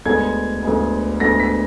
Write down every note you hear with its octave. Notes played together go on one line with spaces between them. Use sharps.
D2 D3 G#3 B3 G#6
D2 D3 G#3 B3
D2 D3 G#3 B3 A#6
B6